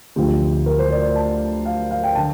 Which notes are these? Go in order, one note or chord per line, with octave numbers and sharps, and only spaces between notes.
D2 D3 F3 G4
A#4
C5
D5
A5
F5
F5
G5
D3 A5